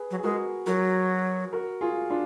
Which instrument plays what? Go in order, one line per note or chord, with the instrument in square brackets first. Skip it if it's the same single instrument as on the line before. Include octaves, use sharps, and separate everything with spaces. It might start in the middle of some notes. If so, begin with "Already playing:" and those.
Already playing: [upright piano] G#4 B4
[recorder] F#3
[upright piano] G#4
[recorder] G#3 [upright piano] F#4 A#4
[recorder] F#3 [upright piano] F#4 A#4
[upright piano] F#4 A#4
F4 G#4
D4 F4